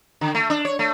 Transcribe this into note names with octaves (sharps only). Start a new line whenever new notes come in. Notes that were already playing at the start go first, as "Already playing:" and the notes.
D3
A3
D4
C#5
A3